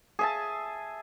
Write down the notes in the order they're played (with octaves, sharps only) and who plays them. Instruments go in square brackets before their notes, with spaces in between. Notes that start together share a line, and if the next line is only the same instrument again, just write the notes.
[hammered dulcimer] G#4 E5 A5